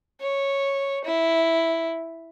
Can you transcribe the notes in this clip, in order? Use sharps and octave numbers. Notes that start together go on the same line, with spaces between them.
C#5
E4